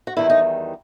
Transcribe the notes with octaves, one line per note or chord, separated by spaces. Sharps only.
F#4
E2 D#3 G3 E4
D#4